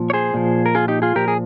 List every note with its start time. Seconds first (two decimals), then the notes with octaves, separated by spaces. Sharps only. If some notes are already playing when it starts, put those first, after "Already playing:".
Already playing: A#2 F3
0.10 C#5
0.13 G#4 C5
0.34 A#2 F3
0.66 A#4
0.75 F4 G#4
0.88 D#4 G4
1.02 F4 G#4
1.16 A#2 F3 G4 A#4
1.28 G#4